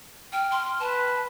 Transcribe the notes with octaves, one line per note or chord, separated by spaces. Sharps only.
G5 F6
C6
B4 A5